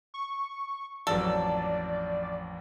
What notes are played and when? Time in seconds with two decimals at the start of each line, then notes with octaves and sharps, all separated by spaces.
0.14 C#6
1.07 A1 F2 F#3 A4 D5